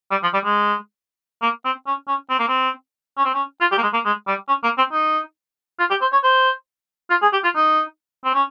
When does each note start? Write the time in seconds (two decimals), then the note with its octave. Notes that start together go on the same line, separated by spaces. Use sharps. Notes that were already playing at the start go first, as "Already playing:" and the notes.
0.11 G3
0.23 F3
0.33 G3
0.45 G#3
1.42 A#3
1.65 C4
1.87 C#4
2.08 C#4
2.30 C4
2.39 A#3
2.48 C4
3.17 C#4
3.25 C4
3.34 C#4
3.61 F4
3.72 G4
3.78 A#3
3.83 G#3
3.93 A#3
4.05 G#3
4.27 G3
4.48 C#4
4.63 A#3
4.78 C4
4.92 D#4
5.79 F4
5.90 G4
6.01 C5
6.12 C#5
6.23 C5
7.10 F4
7.22 G#4
7.33 G4
7.44 F4
7.55 D#4
8.25 C4
8.34 C#4